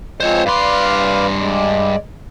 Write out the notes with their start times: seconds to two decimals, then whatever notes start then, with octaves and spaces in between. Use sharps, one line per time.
0.20 F3 G#3 C4 C5 C#5
0.46 G2 B4 D5 F5 C6
1.39 G#3 D5